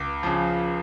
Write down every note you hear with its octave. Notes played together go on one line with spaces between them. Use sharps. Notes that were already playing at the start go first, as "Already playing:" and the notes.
Already playing: C#2 D6
C#3 F3